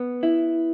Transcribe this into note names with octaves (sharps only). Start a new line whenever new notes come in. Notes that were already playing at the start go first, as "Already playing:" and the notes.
Already playing: B3
E4